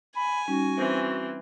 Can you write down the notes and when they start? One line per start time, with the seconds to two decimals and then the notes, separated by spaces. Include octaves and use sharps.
0.16 G#5 B5
0.48 G3 C#4 D#4 F#4
0.77 E3 C4 C5